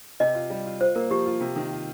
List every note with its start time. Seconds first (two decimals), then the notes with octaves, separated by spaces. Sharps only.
0.20 C3 D#5
0.35 F4
0.50 G3
0.66 F4
0.80 F4 C5
0.95 A#3 A#4
1.10 F3 G4
1.26 F4
1.41 C3
1.56 D#3
1.71 F4